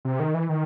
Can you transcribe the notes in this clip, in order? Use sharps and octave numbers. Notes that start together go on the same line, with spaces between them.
C3
D#3
E3
D#3